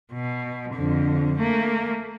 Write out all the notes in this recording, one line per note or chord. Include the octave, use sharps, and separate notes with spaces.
B2
F2 D3
A3 A#3